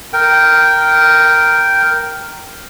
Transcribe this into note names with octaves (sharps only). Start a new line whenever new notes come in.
A#4 G5